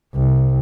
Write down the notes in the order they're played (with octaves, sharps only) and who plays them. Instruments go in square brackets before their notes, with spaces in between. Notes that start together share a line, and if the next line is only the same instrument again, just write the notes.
[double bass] C2